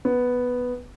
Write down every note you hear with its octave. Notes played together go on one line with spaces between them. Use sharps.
B3